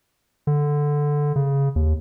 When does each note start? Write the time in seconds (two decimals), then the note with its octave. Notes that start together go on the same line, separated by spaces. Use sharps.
0.47 D3
1.36 C#3
1.76 D#2